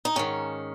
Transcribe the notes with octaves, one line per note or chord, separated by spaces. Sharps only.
D#4
G#2 D#3 C#4